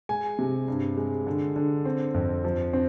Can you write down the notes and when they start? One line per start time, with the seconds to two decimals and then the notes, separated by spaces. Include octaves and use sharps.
0.09 G#3 G#5
0.39 C3
0.68 G2
0.97 G#3
1.27 D3
1.56 D3
1.85 C4
2.14 F2
2.44 F3
2.73 C4